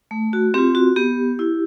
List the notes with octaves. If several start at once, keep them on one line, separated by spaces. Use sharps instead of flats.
A3
F#4
C4 F4 G4
F#4
B3 G4
E4